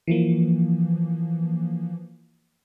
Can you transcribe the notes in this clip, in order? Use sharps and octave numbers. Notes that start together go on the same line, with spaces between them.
E3 F3 A#3